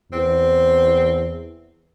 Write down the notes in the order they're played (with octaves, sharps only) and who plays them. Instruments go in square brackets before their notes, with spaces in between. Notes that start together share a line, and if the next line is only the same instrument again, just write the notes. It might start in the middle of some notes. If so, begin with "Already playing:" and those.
[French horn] E2 [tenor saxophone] C4